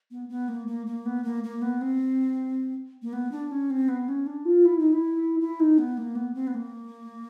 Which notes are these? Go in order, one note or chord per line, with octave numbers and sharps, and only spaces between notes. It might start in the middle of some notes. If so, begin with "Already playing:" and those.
B3
B3
A#3
A#3
A#3
B3
A#3
A#3
B3
C4
A#3
B3
D4
C#4
C4
B3
C#4
D4
F4
E4
D#4
E4
E4
D#4
B3
A#3
B3
C4
B3
A#3